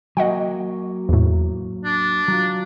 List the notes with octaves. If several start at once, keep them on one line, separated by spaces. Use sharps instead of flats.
F#3 A#3 D#5 F#5 G5
E2 A2
D4
F#3 F4